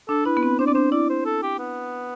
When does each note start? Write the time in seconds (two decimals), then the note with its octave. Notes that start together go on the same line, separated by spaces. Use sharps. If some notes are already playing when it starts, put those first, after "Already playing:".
0.08 D4 A4
0.25 E4 B4
0.37 B3
0.43 C4
0.59 D4 C5
0.66 C4 D5
0.74 D4 C5
0.92 E4 D5
1.09 C5
1.25 A4
1.43 G4
1.58 B3